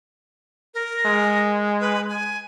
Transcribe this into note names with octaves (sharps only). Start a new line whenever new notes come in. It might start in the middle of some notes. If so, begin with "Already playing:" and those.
A#4
G#3
B4
G#5